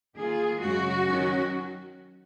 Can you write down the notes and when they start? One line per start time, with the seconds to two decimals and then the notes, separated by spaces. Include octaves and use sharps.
0.16 D#3 A#3 F4 G#4
0.61 F#2 C#3 G#3 F#4
1.06 D#3 F#3 C#4